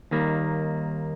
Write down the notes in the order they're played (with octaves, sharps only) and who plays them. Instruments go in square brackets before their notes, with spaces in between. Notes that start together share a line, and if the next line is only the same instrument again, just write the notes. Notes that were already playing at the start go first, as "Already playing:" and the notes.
[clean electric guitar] D#2 D#3 G3 A#3